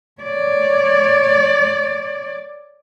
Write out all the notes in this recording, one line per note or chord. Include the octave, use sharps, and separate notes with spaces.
C#5 D5